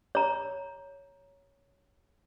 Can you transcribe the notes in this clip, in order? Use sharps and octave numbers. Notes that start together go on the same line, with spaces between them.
C#5 A#5